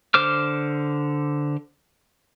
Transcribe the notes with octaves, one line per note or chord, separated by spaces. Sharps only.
D3 C5 D6 F6